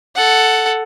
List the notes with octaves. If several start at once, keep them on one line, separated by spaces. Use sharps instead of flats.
A4 F#5